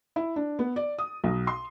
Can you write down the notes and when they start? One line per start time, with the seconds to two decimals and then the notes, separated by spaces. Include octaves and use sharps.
0.16 E4
0.36 D4
0.59 B3
0.76 D5
0.99 D#6
1.24 B1
1.47 C6